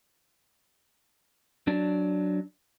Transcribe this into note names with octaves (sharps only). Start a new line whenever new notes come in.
F#3 D4 D5